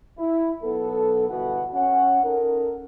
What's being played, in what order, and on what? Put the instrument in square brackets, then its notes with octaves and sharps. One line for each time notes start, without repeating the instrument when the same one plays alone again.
[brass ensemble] E4
B1 B3 A4
G1 B2 E3 F#4 B4 F#5
C#4 F#5
C#4 D#4 A4 A#4